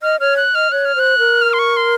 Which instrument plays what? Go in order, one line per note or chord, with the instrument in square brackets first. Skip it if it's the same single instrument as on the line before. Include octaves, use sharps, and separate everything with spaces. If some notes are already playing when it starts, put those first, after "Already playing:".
[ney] D#5 [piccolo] F6
[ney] C#5 [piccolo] F6
[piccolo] F#6
[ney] D#5 [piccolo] F6
[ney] C#5 [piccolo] F#6
[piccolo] F6
[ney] C5 [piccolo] F#6
[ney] A#4
[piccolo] F6
C6
C#6
C6